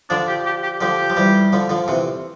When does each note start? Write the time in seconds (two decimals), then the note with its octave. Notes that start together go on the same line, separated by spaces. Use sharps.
0.10 D3 F3 D4
0.29 G4
0.46 G4
0.63 G4
0.81 D3 F3 G4
1.10 F3
1.17 E3 G3
1.53 D3 F3
1.69 D3 F3
1.88 C3 E3